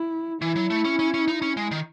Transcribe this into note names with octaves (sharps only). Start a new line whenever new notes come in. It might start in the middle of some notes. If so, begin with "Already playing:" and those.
Already playing: E4
E3 E4
F#3
A3
C#4
C#4
C#4
D#4
C#4
G#3
D#3